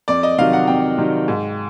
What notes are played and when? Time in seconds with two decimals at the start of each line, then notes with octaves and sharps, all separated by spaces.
0.08 F2 D5
0.23 D#5
0.38 C3 D#3 F#3 F5
0.53 F#5
0.67 F2 G5
0.98 C3 D#3 F#3
1.28 G#2